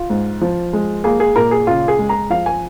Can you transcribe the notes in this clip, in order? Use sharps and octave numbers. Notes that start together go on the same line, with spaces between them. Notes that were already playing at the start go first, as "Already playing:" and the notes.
Already playing: F4
G#2
F3
G#3
A#3 G#4
G#4
A#2 A#4
G#4
C#3 F4
G#4
G#3
A#5
F3 F5
G#5